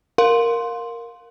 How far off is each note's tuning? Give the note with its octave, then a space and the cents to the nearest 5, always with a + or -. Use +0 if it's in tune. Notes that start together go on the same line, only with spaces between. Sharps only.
A#4 +0 F5 +25 C6 +0